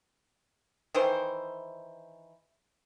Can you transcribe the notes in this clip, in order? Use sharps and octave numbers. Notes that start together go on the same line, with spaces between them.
D#3 E3 C5